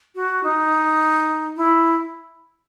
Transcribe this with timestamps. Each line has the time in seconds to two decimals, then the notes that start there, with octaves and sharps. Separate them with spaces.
0.15 F#4
0.43 D#4
1.56 E4